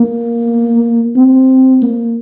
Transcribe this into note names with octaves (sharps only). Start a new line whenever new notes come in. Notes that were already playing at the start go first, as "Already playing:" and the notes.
Already playing: A#3
C4
A#3